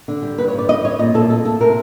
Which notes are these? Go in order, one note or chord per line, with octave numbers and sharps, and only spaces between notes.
D3
G3
G2 B4
C#5
G2
D5
D3 D#5
G2 C#5
A#2 D#5
A#2 A4
A3 A4
A3 A4
C3 A#4